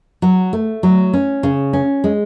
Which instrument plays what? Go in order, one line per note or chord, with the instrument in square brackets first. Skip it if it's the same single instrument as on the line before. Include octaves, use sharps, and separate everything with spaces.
[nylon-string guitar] F#3
A3
F#3
C#4
C#3
C#4
G#3